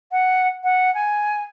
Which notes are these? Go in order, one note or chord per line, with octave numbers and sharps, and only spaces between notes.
F#5
F#5
G#5